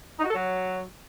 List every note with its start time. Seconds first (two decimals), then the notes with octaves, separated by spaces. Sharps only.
0.19 D#4
0.24 F#4
0.29 A4
0.35 F#3